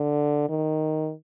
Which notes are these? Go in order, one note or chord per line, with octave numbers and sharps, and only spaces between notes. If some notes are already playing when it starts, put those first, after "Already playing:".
Already playing: D3
D#3